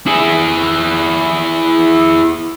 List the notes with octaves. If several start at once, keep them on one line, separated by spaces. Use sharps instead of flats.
E4 G#4